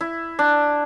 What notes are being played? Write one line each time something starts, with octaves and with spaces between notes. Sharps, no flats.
E4
D4